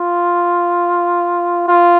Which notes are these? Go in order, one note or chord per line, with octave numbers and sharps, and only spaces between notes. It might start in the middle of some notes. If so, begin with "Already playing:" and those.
Already playing: F4
F4